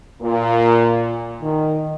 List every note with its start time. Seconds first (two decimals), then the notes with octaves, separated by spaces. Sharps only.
0.21 A#2
1.42 D#3